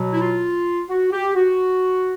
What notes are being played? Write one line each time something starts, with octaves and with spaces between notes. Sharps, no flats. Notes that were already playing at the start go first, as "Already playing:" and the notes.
Already playing: B2 F#3
E4
F4
F#4
G4
F#4